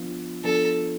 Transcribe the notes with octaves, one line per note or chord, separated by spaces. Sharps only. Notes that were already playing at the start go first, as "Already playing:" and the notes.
Already playing: F3 B3 D4 F4
F3 B3 D4 F4 A4